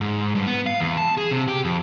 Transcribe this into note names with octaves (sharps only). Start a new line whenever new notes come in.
G#2
G2
B3
F5
E2
A5
G#4
C3
G4
F2